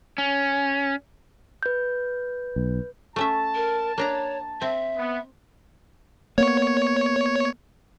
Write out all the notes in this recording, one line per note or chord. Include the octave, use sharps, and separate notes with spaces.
C#4
B4 G6
B1
A3 C#4 E5 A5
A#4
A#3 D4 C#5 A#5
C4 E5
B3
A#3 B3 C#5